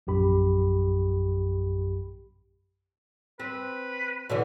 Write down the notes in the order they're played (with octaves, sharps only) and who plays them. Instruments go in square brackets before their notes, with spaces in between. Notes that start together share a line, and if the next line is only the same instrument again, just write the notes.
[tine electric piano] A#1 F#2 G4 B5
[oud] C4 [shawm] B4
[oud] B2 D3 E3